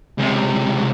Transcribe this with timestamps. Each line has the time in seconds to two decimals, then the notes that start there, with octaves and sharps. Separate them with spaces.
0.18 C#2 C3